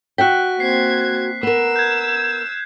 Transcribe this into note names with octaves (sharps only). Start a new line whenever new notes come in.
F#4 E5 G5 F#6 B6
A#3 C4 G#6 C7
B3 A#4 E6
G6 G#6